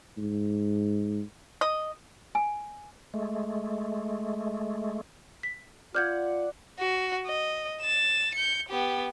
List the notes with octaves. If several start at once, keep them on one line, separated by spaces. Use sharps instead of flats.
G#2
D#5
G#5
G#3 A3
B6
F4 D5 F#5 F6 G6 G#6
F#4
D#5
A6 E7
G6 C#7
B3 G4